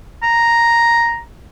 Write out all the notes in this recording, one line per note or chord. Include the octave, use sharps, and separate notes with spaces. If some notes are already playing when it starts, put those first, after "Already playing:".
A#5